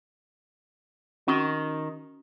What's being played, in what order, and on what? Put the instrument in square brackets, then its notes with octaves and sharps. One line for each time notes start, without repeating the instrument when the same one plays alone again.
[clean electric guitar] D#3 [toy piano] C#4 F#4 C#6